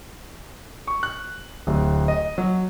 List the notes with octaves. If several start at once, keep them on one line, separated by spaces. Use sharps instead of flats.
C#6
F#6
D1
D#5
F#3